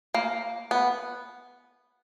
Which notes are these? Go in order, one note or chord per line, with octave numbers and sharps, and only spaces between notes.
A#3
B3